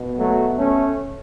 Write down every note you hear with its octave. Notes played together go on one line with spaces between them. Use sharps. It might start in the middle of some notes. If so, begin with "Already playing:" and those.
Already playing: B2
F#3 A3
A3 C#4